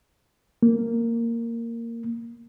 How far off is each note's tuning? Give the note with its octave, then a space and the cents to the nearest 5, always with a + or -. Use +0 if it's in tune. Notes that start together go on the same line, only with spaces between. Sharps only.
A#3 -10